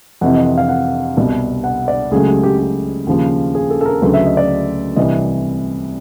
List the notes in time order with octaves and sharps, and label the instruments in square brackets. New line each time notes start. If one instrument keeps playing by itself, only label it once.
[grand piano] F2 C3 E3 F#5
D#5
F5
F#5
C2 B2 G3
F#5
D5
C#2 C#3 F#3 A3 G#4
G4
G4
G4
D#2 C#3 F3
G#4
A4
A4
A#4
D2 C#3 F#3 A3 B4
E5
D#5
D5
C2 C3 E3 D#5